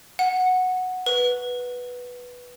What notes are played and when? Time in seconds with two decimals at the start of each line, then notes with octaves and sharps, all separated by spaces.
0.19 F#5
1.06 B4